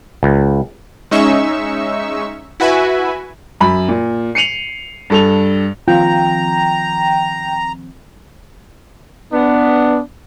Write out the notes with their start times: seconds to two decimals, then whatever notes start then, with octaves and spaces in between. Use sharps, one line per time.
0.23 C#2
1.11 G#3 C#4 D#4 E5 C#6 E6
2.60 E4 F#4 B4 E5 G#5
3.61 F#2 B5
3.88 A#2
4.35 C7 C#7 D#7 F7 F#7
5.10 G2 A4 F7
5.88 D#3 F3 C4 F4 G5 A#5
9.32 B3 D4